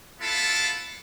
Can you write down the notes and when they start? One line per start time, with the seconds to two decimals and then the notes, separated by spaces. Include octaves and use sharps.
0.21 B3 E4 F4 A4